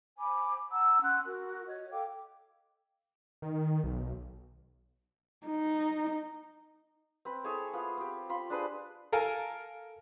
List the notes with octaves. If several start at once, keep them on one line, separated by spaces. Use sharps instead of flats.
C5 G#5 B5 D6
F#5 A5 A#5 E6
C#4 F#5 C6 F#6
F#4 A#4
C#5 D#5
A4 F5 G5 D6
D#3
B1
D#4
C4 B4
E4 G#4 A4 C#5
B3 F4
C4 G4
F4 B5 C6
D4 G#4 B4 C5
A4 A#4 F5 G#5